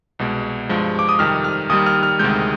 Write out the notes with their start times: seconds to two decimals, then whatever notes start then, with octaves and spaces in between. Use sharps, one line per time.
0.19 C2 B2 G#3
0.69 G2 F3 G#3
0.99 D6
1.09 D#6
1.19 F2 C3 D#3 G3 F6
1.44 F6
1.70 D#2 D#3 G3 D#6
1.86 F6
2.03 F6
2.19 D2 C3 D#3 G#3 G6